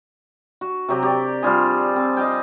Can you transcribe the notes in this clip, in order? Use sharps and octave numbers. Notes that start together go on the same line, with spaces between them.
F#4
C3 F#3 G4 A#4
G4 D5
F3 G3 F4 G#4
C4
D#5 F5 G5